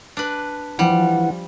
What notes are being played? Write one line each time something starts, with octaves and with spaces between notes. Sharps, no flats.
D4 B4
E3 F3 G3 F#5